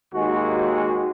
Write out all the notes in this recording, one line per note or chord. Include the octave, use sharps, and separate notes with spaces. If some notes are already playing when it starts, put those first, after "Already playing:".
D#2 G#3 F#4